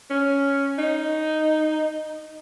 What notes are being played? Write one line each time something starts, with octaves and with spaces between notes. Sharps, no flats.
C#4
D#4